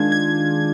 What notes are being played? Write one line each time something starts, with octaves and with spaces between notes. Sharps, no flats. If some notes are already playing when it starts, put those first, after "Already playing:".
Already playing: D#3 G#3 D4 F4 G#6
G#6